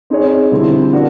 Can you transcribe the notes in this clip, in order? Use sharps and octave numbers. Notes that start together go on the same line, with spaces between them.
C4 D#4 G#4 C#5
D3 G3 C4 E4
A#3 D4 F#4